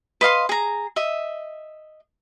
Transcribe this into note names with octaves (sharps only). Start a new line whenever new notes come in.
B4 D#5 F5 C6
G#4 A#5
D#5 E5